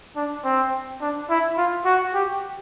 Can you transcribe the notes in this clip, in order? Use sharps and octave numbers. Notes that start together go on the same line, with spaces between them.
D4
C4
D4
E4
F4
F#4
G4